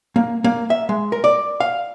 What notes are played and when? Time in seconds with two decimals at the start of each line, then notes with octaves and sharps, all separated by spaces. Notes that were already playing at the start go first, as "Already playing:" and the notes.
0.16 A#3
0.44 A#3
0.70 E5
0.89 G#3
1.12 A#4
1.24 D5
1.60 F5